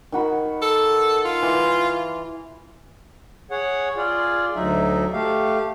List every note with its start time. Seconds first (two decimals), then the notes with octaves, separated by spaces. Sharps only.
0.12 D#3 F#4 B5
0.62 A4
1.25 F4
1.42 E3 C6
3.51 G#4 C#5 F#5
3.97 F4 G#4 D5
4.56 D2 F#3 D#4 E5
5.13 A3 G4 F5